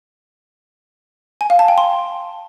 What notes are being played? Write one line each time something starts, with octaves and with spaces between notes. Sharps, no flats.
G#5
F5
A5
G5
C6